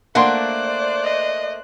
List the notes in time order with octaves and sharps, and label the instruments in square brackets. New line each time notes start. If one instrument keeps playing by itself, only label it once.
[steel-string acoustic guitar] A3 A#3 D4 [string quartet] C5 D5 F#6 [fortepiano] F#5 C6
[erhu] D#5